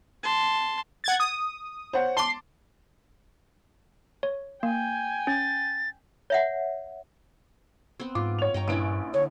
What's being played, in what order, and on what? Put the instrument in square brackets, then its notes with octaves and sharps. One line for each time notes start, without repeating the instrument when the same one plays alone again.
[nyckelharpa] A5 C6
[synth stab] F#5 G#6 A6
D#6
[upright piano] C5 C#5 F#5
[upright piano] A5 D6 [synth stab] C6
[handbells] C#5
[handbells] A#3 [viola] G5 G#5
[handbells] C#4 [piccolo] A6
[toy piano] C#5 E5 F#5
[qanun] B3 C4
[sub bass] G#2 [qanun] F4 [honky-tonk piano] D6
[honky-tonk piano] C#5 F7
[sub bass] G2 [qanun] D#5 G5 A#5
[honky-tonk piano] A#1 D7 [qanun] C#4 E4 B4
[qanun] D3 [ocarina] C#5